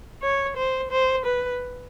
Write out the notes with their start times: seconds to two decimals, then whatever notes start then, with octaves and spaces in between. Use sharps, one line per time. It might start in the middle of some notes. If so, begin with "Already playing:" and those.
0.22 C#5
0.57 C5
0.91 C5
1.25 B4